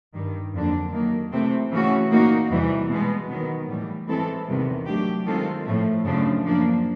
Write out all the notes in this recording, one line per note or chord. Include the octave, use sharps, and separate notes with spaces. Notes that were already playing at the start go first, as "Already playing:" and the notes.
G2 D#3 G3
F2 D3 F#3 A#3 D4
D#3 F#3 A#3
C3 E3 A3 C4
C#3 E3 A3 C#4 F#4
A#2 F#3 A#3 D#4 F#4
E2 C3 E3 G3
B2 G#3 B3
D#3 F#3 B3
A2 E3 G3
E3 G#3 C4 E4 A4
E2 C3 D#3 G3 B3
F#3 A3 D4 G4
D#3 G#3 C4 F4 A4
A2 F3 A3
F#2 C#3 F3 A3 D4
F3 A#3 D4